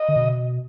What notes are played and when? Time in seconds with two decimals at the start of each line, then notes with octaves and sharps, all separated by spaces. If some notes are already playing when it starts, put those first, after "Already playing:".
Already playing: D#5
0.08 D3
0.16 B2